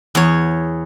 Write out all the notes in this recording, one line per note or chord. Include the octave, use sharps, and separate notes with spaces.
E2 C#5